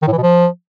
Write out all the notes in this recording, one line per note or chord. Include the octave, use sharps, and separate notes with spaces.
D#3
A2
E3
B2
F3